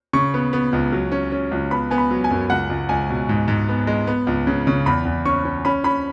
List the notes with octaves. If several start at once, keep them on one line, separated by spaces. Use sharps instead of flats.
C#3 C#6
B3
B3
C#2
F#3
C#4
C#4
C#2
B3 B5
B3 G#5
B5
F#3
G#5
F#2
C#2 F#5
C#2
C#2 G#5
B2
G#2
G#2
B3
G#3
B3
C#2
C#3
C#3
E2 B5
E2
C#4 C#6
C#4
C#4 B5
C#4 B5